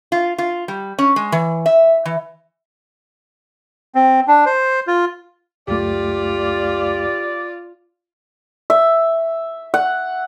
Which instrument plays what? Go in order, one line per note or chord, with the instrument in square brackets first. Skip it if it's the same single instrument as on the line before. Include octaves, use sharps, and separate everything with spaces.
[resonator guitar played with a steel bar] F4
F4
G3
C#4
G#3
E3
E5
E3
[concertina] C4
D4
C5
F4
[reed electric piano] C#2 F#2 A3 [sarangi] F4 [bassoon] G4 [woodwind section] D5
[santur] E5
F#5